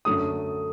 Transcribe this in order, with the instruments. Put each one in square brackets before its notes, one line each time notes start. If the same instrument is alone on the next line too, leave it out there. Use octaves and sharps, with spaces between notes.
[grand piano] F#2 D3 F#3 A3 D#6